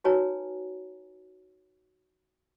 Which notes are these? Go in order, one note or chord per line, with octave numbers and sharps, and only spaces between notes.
D#4 F#4 B4 C#5 G#5 A#5